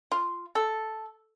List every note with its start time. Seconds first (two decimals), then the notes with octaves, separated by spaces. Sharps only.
0.12 F4
0.55 A4